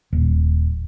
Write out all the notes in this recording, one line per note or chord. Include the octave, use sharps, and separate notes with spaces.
D#1